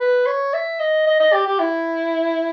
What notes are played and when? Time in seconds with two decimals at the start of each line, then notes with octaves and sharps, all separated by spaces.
0.01 B4
0.26 C#5
0.54 E5
0.79 D#5
1.07 D#5
1.20 D#5
1.33 G4
1.46 G4
1.59 E4